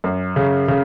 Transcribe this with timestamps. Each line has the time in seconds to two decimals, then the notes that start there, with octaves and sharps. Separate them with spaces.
0.04 F#2
0.36 C#3
0.68 C#3